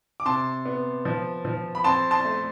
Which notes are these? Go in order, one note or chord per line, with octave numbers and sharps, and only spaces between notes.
D6
C3 A5 C6
B3
F3
F3
B5
C4 A5 C6
A5 C6
A3